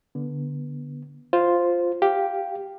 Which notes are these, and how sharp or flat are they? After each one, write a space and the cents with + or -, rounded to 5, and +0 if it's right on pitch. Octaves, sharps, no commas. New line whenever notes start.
D3 -15 B3 -25
F4 +0 C5 +0
G4 +0 F5 +0